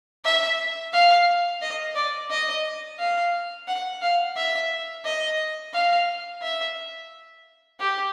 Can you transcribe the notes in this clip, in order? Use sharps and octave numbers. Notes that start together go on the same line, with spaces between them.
E5
F5
D#5
D5
D#5
F5
F#5
F5
E5
D#5
F5
E5
G4